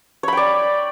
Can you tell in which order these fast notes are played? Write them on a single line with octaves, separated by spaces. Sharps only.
C#5 B5 G5 D5